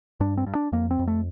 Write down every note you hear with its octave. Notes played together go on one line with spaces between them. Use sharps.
G2 D4
C4
G2
D4
F2 A#3
C4
F2
A3